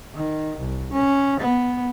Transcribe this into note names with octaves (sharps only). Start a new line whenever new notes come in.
D#3
C2
C#4
B3